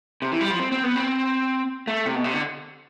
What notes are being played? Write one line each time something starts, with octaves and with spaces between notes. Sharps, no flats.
C3
E3
G3
F3
C4
C4
B3
C4
A3
C3
B2
C3
D3